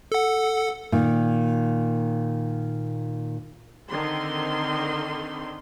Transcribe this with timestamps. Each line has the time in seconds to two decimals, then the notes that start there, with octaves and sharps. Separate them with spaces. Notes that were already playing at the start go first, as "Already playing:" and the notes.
0.12 A4 F#5
0.92 A#2 D#3
3.90 D3 D#3 C4 C6